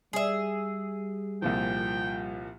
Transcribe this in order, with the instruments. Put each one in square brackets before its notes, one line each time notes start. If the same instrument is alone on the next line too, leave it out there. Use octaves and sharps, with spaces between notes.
[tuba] G3 [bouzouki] G#4 E5
[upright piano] C2 A#2 F3 [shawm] G5